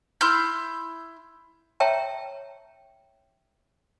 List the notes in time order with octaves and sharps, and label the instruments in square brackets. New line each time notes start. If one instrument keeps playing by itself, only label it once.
[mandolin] E4 C6 F6 G6
[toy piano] C#5 E5 G5 A5 A#5